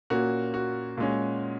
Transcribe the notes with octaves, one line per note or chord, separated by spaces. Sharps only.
A#2 A#3 C#4 F#4
F#4
A#2 G#3 C#4